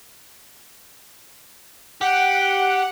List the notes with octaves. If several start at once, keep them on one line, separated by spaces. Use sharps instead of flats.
G4 F#5